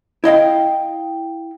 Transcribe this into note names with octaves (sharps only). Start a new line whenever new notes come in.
E4 D#5 F5 G5